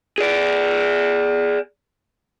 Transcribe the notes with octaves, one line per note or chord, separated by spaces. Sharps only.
G#4 D5